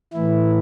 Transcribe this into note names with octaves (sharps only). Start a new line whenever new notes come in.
A2 E3 E4